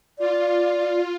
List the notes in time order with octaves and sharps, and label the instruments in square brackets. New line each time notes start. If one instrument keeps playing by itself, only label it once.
[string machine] F4 [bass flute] D5